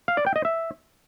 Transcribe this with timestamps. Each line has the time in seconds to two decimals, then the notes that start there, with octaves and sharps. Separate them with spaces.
0.08 F5
0.17 D5
0.26 G5
0.36 D#5
0.45 E5